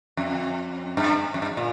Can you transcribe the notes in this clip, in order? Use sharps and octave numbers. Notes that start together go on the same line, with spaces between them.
F2
G2
F2
G2
A#2